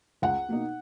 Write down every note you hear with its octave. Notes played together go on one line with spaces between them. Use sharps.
C#2 F#5
B2 A#3 D#4